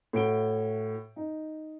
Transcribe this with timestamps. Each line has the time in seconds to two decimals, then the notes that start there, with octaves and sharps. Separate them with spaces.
0.13 A2 F#4 D7 G7
1.16 D#4